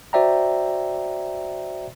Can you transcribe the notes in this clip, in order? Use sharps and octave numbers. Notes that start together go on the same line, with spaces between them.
F#4 C5 D5 E5 G5 A#5